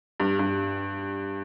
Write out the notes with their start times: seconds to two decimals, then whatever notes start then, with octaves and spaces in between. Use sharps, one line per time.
0.20 G2
0.39 G2